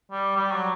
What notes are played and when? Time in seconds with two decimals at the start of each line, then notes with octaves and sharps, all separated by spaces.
0.11 G3
0.36 G3
0.52 F#3